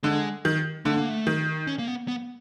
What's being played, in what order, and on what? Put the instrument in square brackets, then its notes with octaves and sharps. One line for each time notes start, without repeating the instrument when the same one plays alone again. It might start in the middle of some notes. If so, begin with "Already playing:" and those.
[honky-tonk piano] D3 [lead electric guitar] G#3
[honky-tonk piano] D#3
[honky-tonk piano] D3 [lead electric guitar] A3
[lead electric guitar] A#3
A3
[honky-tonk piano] D#3
[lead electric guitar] C#4
A#3
B3
B3